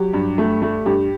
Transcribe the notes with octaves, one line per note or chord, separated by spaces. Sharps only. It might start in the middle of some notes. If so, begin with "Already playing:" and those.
Already playing: F#3 G4
G2
A3
A3
G2 G4